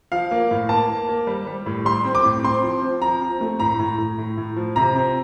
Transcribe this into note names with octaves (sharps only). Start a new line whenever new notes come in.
F3 F5
A#3
A2
A#3 A5
A#3
A#3
G3
G3
A2
G3 C6
C4
D6
A2
C4 C6
F3
C4
F3 A#5
C4
A3
A2 A#5
A2
A2
A2
A2
F3
C3 A#5
C4